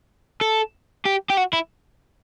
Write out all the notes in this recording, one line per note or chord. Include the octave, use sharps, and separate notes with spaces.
A4
G4
G4
F#4
E4